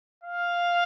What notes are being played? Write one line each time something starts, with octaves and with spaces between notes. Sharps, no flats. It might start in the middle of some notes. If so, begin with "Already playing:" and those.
F5